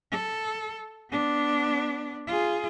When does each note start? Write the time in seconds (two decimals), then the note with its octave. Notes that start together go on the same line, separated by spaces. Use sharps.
0.12 A4
1.10 B3 D4
2.27 F4 G#4